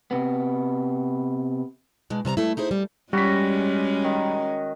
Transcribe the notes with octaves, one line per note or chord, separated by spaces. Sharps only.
C3 B3
B2 G#3 D4
C3 G3 A5 A#5
G2 A3 E4
D#4 E4 G#4 C5
G3
G3 G#3 C#4 F#4 B6
D#3